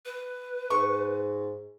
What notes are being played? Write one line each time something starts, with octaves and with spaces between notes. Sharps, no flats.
B4
G#2 C#6